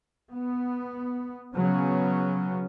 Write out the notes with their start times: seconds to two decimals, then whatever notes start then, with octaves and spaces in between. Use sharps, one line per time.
0.32 B3
1.56 C#3 F#3 B3 C#4